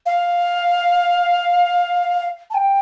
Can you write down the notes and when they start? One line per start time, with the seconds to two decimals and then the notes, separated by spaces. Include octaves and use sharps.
0.06 F5
2.50 A5
2.54 G5